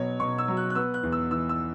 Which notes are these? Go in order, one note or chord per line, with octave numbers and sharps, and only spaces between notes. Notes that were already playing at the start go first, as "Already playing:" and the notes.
Already playing: B2 F#3 C#5
B2 C#6
E6
F#3
F#6
F#6
B3 E6
F#6
E2
E6
E3 E6
E6